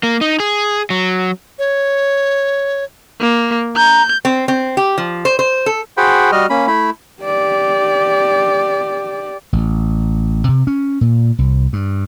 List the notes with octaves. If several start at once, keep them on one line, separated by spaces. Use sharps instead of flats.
A#3
D#4
G#4
F#3
C#5
A#3
A#5 G6
C4
C4
G4
F3
C5
C5
A4
F#4 G#4 C5 F#5 G5 B5
G3 F#4 D#5 F6
A#3 C#4 B5
A3 E4 B5
G4 D5
A1
C3
C#4
A#2
C2
G2